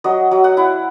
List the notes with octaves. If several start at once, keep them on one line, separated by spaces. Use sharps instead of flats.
F#3 D#5
F#3
F#5
E4